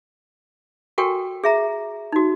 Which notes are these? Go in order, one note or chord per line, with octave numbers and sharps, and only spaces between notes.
F#4 A4 A#4 G5 G#5 C#6
G#4 E5 A#5
D#4 F#4